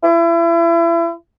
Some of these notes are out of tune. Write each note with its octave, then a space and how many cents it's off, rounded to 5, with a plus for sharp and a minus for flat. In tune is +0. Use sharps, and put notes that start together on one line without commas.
E4 +35